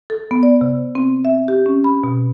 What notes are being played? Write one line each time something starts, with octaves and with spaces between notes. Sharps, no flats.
A4
B3
D5
C3
C4
E5
G4
C#4
B5
B2